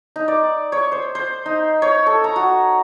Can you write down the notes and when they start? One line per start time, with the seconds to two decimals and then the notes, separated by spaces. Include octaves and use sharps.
0.16 D#4
0.28 D5
0.72 C#5
0.92 C5
1.15 C5
1.46 D#4
1.82 C#5
2.07 A4
2.24 A#5
2.36 F#4